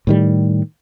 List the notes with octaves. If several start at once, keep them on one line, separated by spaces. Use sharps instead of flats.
A2 D#3 G3